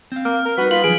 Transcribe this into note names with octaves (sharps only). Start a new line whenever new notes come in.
C4 F5
A#3 F6
A#4
G3 D#4 F#4 B4
B3 F4 B6 F#7
D3 F3 F#3 G#4 D7 F#7